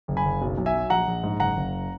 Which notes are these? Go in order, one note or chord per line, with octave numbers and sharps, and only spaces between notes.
F#1
G#5 B5
F#1
B1
B1
E5 G#5
F#3
A#1 F#5 A#5
A#1
G#2
F#1 F#5 A#5
F#1